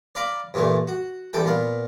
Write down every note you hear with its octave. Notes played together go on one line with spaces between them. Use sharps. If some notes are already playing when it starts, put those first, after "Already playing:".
D5 F5 A#5 B5 D6
G2 A#2 E3 A3
F#4
E2 G3 A4 G5
A#2 B3 F5